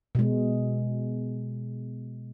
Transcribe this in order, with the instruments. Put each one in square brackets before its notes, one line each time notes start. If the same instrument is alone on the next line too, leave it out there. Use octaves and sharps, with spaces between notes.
[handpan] B2 G#3